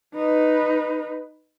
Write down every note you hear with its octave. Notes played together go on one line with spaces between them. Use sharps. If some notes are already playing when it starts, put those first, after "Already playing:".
D#4 B4